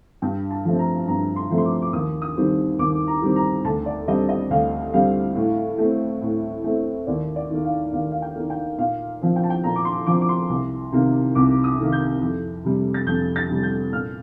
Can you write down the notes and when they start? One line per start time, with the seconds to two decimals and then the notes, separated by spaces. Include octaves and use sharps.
0.22 G2 G5
0.51 A5
0.65 F3 A3 C4
0.79 A#5
1.08 G2 A#5
1.36 C6
1.51 F3 A3 C4
1.58 C6
1.65 D6
1.82 D6
1.93 D#2 D#6
2.22 D#6
2.36 D#3 G3 C4
2.79 D#2 D6
3.07 A#5
3.22 D#3 G3 C4
3.36 A#5
3.64 D2 A5
3.86 D5
4.08 D3 G3 C4 D#5
4.29 D#5
4.50 D2 F5
4.94 D3 G3 C4 F5
5.36 A2
5.78 A3 C4
6.22 A2
6.64 A3 C4
7.07 D#2 D5
7.36 D5
7.50 D#3 A#3
7.64 F5
7.92 D#2 F5
8.11 F5
8.22 G5
8.36 D#3 A#3
8.50 G5
8.78 A#2 F5
9.21 F3 C4
9.36 G5
9.44 A5
9.50 G5
9.64 A#2 A#5
9.76 D6
9.85 C6
10.06 F3 C4 D6
10.21 D6
10.29 C6
10.49 C2
10.92 C3 D#3 A#3
11.35 C2 D6
11.64 D#6
11.78 C3 D#3 A#3
11.92 G6
12.22 F2
12.64 C3 G3
12.94 A6
13.07 F2 G6
13.36 A6
13.49 C3 G3
13.63 G6
13.92 A#2 F6